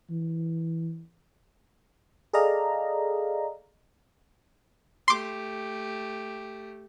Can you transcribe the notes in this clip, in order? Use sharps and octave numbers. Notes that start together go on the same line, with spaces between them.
E3
G#4 A4 D5 D#5 F5 A#5
A3 G4 C6 D6